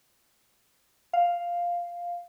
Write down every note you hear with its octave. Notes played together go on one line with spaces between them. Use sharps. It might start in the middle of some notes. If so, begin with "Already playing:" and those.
F5